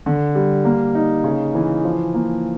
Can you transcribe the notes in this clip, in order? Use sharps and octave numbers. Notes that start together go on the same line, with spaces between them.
D3
G3
A#3
D#4
C#3
E3
F3
A#3